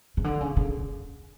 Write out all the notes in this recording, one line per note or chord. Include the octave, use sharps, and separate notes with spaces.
C#3
D3
C#3
C#3